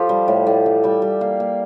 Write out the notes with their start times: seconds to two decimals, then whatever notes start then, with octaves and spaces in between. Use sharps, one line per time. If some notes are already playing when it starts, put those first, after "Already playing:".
Already playing: F3 G4 A4
0.09 G3
0.28 A2
0.47 A2
0.66 E3
0.84 G3 E5
1.02 G3
1.21 A#3 F5
1.40 A#3